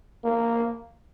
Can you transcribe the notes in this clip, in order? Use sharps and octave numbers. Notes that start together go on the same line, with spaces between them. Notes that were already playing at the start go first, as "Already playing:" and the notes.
A#3